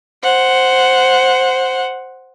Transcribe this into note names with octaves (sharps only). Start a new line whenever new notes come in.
C5 F#5